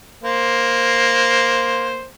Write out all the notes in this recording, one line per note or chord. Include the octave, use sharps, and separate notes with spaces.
A#3 C5